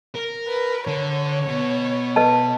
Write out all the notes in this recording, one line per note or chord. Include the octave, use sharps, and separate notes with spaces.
A#4
B4
D3 C#5
B2
B4 D#5 A5